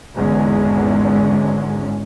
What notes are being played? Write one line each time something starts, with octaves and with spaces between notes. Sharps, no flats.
G#1 E2 G#2 D3 G#3 C#4